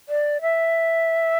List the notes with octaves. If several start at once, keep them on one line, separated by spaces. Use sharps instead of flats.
D5
E5